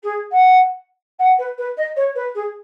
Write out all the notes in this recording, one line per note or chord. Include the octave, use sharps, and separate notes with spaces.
G#4
F#5
F#5
B4
B4
D#5
C#5
B4
G#4